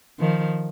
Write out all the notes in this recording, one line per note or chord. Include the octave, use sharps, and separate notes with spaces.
D#3 F3